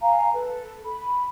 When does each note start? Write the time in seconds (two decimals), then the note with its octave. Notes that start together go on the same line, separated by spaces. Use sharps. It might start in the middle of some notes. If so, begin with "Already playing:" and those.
0.01 F5 G#5 A#5
0.35 A4 B4
0.85 B5